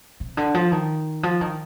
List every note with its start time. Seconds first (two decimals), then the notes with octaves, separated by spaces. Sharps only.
0.20 C3
0.37 D3
0.54 F3
0.72 D#3
1.23 F3
1.41 D#3